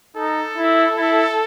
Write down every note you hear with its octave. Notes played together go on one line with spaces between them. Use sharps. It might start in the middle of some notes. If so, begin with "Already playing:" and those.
D#4 A4
E4
E4